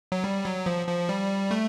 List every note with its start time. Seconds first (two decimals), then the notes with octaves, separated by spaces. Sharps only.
0.12 F#3
0.24 G3
0.44 F#3
0.66 F3
0.87 F3
1.09 G3
1.51 A3